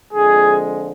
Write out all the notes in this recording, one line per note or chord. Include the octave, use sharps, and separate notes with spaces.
F2 D3 F3 G#3 G#4